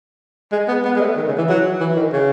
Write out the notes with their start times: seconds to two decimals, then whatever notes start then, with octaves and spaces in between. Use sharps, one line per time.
0.52 G#3
0.68 B3
0.85 B3
0.96 G#3
1.01 A3
1.17 D#3
1.28 C#3
1.38 E3
1.49 F#3
1.81 E3
1.96 D#3
2.13 C#3